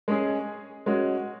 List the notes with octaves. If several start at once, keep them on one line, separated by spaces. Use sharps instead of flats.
G#3 C#4 G#4
G#3 C#4 F#4